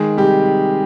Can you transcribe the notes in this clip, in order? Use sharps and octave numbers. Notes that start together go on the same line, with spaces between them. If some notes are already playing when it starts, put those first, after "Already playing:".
Already playing: D#3 G#3 G#4
C3 G3 G4